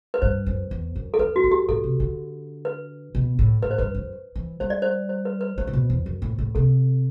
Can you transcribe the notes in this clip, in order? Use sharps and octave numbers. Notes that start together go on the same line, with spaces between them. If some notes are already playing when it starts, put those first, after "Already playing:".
B4
G2 C5
F#2
E2
F#2
A4
F#2 B4
F#4
F#2
G4
A2 A4
C3
D3
B4
B2
A2
A2 B4
C5
G2 B4
F#2
E3
G3 C5
D5
C5
C5
B4
B4
A3 C5
A2
B2
E2
F#2
A2
A2
C3 A4